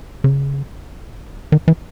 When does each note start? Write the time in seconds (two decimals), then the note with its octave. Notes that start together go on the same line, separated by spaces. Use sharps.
0.24 C#3
1.52 D#3
1.68 E3